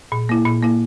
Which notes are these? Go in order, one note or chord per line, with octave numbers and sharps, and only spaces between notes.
A#2
A#3 E4
A#2
A#3 E4